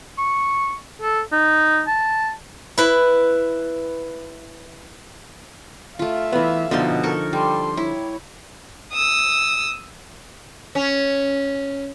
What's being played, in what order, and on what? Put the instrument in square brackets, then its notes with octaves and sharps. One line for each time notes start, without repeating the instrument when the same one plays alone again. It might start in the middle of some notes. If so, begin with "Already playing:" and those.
[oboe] C#6
A4
D#4
A5
[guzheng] E4 B4
[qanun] A3 F4 [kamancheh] E5 F5
[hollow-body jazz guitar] E3 B3
[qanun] B2 D#4 C6 [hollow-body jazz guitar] D3 F3
[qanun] A4 A#4 C#6
[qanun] G3 [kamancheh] A4 C6
[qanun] E4 [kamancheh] C#5
[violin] D#6 E6
[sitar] C#4